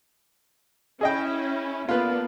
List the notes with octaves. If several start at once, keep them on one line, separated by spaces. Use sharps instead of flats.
C#4 E4 G#4 D#5 G5
A#3 B3 D4 F4 B4